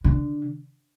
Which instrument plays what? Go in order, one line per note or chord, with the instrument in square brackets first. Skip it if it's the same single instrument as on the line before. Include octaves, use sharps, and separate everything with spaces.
[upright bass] D3